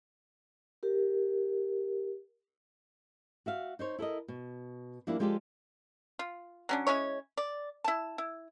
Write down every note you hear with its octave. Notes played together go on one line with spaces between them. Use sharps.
G4 A#4
F#4 E5 F5
D#4 C5 C#5
E4 A4 A#4 D#5
B2
F3 G3 A#3 D4 E4
F3 G#3 F4 G4 A4 D5
F4
F#3 C#4 D4
G#3 C#4 E4 C#5
D5
E4 A5
E4